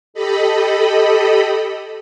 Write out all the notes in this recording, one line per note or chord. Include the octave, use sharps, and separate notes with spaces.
G4 A4 D#5 B5